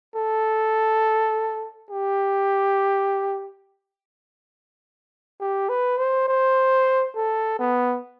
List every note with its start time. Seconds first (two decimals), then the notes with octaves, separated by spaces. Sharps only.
0.16 A4
1.90 G4
5.40 G4
5.69 B4
5.98 C5
6.28 C5
7.15 A4
7.59 B3